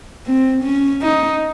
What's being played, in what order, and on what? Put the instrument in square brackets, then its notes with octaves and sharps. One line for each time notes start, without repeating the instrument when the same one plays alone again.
[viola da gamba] C4
C#4
D#4